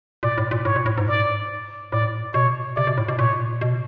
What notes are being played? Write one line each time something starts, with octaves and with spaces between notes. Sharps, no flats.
A#2 D5
A2
A#2
A2 C#5
A#2
A2
G#2
D5
A2 D5
B2 C#5
C3 D5
B2
A2
B2
A#2 C#5
B2